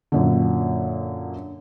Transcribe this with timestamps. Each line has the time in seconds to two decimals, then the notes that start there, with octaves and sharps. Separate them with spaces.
0.12 F#2 A#2 D3